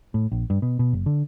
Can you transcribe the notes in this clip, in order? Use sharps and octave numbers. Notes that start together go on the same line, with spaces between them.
A2
A#1
G2
B2
B2
F#1
D3